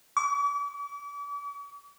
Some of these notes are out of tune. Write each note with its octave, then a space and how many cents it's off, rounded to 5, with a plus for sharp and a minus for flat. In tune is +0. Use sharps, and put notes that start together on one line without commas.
D6 -40